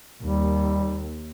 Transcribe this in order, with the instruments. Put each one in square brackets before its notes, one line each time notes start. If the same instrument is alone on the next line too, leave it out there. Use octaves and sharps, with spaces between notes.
[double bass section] D#2 [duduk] G3